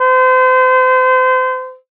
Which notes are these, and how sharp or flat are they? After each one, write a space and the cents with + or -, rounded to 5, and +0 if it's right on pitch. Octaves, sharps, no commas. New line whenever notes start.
C5 -35